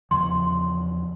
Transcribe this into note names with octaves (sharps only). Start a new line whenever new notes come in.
E2 C#3 F3 C6